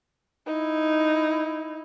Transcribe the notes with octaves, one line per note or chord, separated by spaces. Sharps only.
D#4 E4